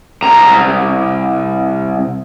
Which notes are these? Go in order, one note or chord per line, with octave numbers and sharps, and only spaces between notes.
C2 A#5